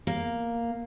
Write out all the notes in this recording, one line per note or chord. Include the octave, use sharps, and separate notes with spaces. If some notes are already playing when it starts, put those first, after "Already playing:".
A#3